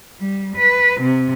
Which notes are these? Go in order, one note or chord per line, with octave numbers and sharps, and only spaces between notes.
G3
B4
C3